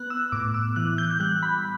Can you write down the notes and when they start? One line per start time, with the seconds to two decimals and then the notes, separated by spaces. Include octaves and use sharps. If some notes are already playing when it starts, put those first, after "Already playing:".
Already playing: B3 F#6
0.10 E6
0.32 A2 D6
0.54 E6
0.76 E3 F#6
0.98 G6
1.11 G6
1.20 G3 F#6
1.43 B5